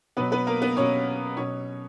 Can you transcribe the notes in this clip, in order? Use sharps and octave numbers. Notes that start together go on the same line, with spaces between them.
B2 F#3 B3 B4
B3 B4
A#3 A#4
B3 B4
B2 F#3 C#4 C#5
B2 F#3 C#4 C#5